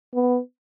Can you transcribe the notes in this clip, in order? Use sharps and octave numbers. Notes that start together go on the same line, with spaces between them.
B3